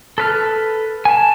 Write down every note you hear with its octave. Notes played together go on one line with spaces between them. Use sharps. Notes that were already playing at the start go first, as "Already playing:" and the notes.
A4 B4 F6
G#5 A5